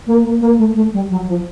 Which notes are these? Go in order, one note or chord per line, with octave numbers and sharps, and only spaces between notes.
A#3
A#3
A#3
A3
A3
G3
F#3
F3